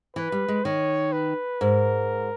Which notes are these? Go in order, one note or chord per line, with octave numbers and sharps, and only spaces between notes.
E3 B4
G3
G#3
D#3 C#5
B4
G#2 A#4